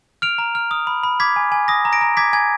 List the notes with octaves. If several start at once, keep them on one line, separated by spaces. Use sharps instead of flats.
F6 D7 F7
A#5
F6
D#6
B5
B5
D6 G#6 B6
G#5
G#5
D#6 A#6
A#5
A#6 D7
A#5
D6 G#6 B6
G#5 G#6